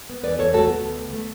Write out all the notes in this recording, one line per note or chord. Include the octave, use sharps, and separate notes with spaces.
B3
E2 B4 D5
E2 A4 C#5
A3 F#4 A4
A3 B3
D2
D2
A3